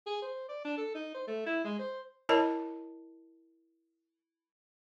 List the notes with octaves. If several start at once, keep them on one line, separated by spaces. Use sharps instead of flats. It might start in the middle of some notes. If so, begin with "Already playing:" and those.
G#4
C5
D5
D4
A4
D#4
C5
A3
E4
G#3
C5
E4 A#4 C#5 D#5 A5